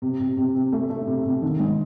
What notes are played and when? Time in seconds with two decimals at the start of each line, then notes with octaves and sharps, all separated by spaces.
0.02 C3
0.20 C3
0.37 C3
0.55 C3
0.72 A3
0.90 A3
1.07 C3
1.25 C3
1.42 D#3
1.60 G#2